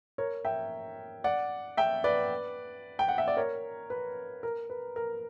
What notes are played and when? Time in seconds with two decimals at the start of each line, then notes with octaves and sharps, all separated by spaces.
0.18 A#4 C#5
0.45 E5 G5
1.24 D5 F#5
1.77 E5 G5
2.04 B4 D5
2.99 G5
3.08 F#5
3.18 E5
3.28 D5
3.37 A#4 C#5
3.90 B4
4.43 A#4
4.70 B4
4.96 A#4